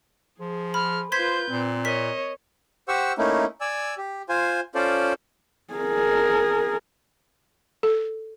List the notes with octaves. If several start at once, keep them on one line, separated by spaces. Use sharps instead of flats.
F3 G#4
B5 F6
F4 B4 C5 C6 G6 G#6 B6
A#2 C4
A#4 C#5 D#5 B6
G4 C5 F#5 C#6 E6
A3 A#3 C#4 D#4 E4
D5 G#5 E6
G4
F4 C5 G#5
C#4 F4 A4 C5 D5
G#4 A#4
A4